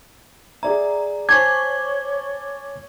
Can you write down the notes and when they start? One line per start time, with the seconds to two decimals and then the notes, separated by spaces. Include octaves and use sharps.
0.63 G#4 D5 E5 A#5
1.29 C5 C#5 G#5 A5 C#6 D6 G#6